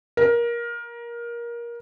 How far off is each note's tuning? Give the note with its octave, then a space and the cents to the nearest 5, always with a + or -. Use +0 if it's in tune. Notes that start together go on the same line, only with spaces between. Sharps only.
A#4 +20